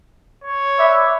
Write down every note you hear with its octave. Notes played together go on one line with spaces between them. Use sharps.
C#5
B4 D5 E5